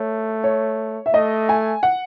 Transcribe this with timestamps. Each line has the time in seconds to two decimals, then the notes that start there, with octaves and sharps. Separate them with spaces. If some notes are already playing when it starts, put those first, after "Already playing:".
Already playing: A3 C#5
0.44 C#5
1.06 E5
1.13 A3 D#5
1.49 G#5
1.83 F#5